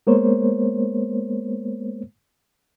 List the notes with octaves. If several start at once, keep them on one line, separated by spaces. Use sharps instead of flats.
G#3 A#3 B3 A#4 C5 C#5